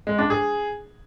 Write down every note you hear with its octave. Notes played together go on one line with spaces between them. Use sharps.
G#3
D4
G#4